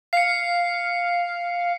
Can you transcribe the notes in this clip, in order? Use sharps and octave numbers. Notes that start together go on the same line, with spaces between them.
F5 C7 C#7